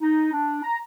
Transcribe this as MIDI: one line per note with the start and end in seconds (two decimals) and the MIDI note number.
0.01 0.31 63
0.33 0.63 62
0.63 0.79 82